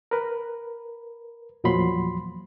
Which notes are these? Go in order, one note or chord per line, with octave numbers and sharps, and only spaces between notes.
A#4 B4
E2 A#2 F3 F#3 B5 C6